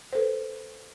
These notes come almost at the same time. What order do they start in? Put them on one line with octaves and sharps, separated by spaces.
C5 A4 B4